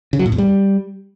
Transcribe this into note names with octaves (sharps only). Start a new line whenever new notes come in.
C#3
F#3
A2
E2
G3